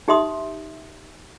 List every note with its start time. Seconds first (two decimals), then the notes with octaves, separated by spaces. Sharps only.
0.08 D#4 G4 E5 C6 D#6